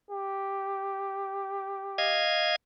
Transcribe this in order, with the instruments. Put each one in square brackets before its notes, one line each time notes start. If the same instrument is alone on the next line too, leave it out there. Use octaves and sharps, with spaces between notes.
[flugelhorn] G4
[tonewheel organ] D#5 F5 G#6